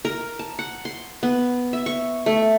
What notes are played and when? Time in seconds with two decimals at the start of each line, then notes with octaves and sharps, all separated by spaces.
0.05 A#4
0.39 A5
0.59 F#5
0.85 C6
1.23 B3
1.73 E5
1.86 C#6
2.26 A3